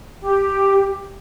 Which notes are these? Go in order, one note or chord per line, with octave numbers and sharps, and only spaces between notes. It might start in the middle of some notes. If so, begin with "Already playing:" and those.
G4